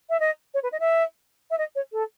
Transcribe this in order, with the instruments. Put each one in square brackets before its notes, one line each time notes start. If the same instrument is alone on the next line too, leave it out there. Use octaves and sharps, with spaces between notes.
[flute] E5
D#5
C#5
B4
D#5
E5
E5
D#5
C#5
A4